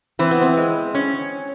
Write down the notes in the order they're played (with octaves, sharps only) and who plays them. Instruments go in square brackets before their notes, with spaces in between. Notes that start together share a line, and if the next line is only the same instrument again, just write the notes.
[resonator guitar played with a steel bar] E3 [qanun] C4
[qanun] B3
C4
[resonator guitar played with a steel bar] G#3
C#4